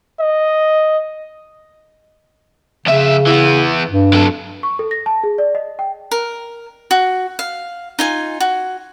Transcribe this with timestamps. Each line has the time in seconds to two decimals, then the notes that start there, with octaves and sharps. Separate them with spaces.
0.20 D#5
2.86 F2 C#3 E5
3.27 E3 B3
3.91 G2
4.13 F#3 A4
4.63 C#6
4.79 A4
4.91 A#6
5.06 A5
5.24 G#4
5.38 D5
5.55 D#5
5.79 G5
6.11 A#4
6.91 F#4
7.39 F5
7.99 D#4 F4 G#5
8.40 F#4